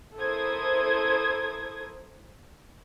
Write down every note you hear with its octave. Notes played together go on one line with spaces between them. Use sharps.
E4 A4 A#4 C5 D#6 G#6